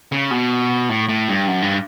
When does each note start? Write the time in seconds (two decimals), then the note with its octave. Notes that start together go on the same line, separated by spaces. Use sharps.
0.12 C#3
0.31 B2
0.89 A2
1.09 A2
1.29 G2
1.48 F#2
1.62 G2